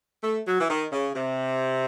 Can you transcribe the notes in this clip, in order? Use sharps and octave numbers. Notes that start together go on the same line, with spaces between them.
A3
F#3
E3
D#3
C#3
C3